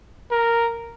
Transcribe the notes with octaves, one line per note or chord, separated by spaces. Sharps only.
A#4